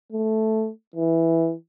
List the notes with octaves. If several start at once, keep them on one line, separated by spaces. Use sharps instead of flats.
A3
E3